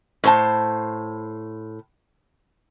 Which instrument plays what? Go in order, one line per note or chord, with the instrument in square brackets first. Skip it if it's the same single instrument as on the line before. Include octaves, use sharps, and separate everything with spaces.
[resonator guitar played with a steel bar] A2 C5 A5